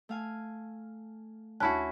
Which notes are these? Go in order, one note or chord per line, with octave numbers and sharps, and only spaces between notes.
A3 F5 G#5
D#2 C#4 E4 F#4 A5 F#6